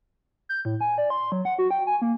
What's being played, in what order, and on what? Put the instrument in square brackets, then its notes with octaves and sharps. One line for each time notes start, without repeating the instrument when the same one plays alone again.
[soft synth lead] G6
A2
G#5
D5
C6
F#3
F#5
F#4
G5
G#5
A#3